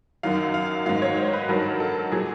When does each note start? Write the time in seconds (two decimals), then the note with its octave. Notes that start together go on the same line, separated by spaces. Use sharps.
0.23 F#2 D#3 F#3 F5
0.54 F5
0.85 G#2 D#3 F#3 F5
1.02 C#5
1.17 C5
1.33 B4
1.49 G2 D#3 F#3 A#4
1.80 A4
2.12 A#2 F#3 G#4